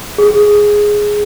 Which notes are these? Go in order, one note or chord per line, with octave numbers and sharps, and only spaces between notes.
G#4